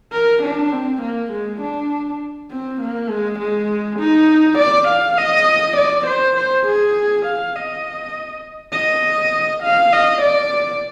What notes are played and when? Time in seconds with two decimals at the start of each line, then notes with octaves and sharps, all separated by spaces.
0.12 A#4
0.43 D4
0.72 C4
1.02 A#3
1.32 G#3
1.61 D4
2.51 C4
2.81 A#3
3.09 G#3
3.39 G#3
3.99 D#4
4.58 D5
4.88 F5
5.18 D#5
5.77 D5
6.07 C5
6.37 C5
6.66 G#4
7.26 F5
7.55 D#5
8.73 D#5
9.63 F5
9.93 D#5
10.22 D5